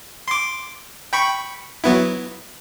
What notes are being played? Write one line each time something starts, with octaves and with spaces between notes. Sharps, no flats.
C6 D6
G5 B5 C#6
F#3 B3 E4